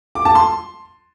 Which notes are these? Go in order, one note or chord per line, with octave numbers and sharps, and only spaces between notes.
D6
A5
C6